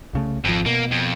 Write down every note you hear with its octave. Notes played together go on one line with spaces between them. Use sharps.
C2 C#3 A3
G#1 F2 F3
B2 A#3
F2